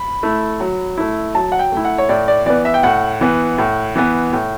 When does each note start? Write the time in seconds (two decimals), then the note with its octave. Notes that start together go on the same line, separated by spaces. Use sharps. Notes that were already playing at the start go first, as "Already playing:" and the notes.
Already playing: B5
0.23 A3 E4
0.60 F#3
0.98 A3 E4
1.34 F#3 A5
1.52 F#5
1.59 G5
1.72 A3 E4
1.85 F#5
1.98 C#5
2.09 A2 D5
2.28 D5
2.46 E3 B3 D5
2.65 E5
2.74 G5
2.83 A2 F#5
3.21 E3 B3
3.58 A2
3.96 E3 B3
4.33 A2